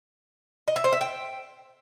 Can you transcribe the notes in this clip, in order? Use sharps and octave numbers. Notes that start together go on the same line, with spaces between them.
D#5
E5
C5
E5
G5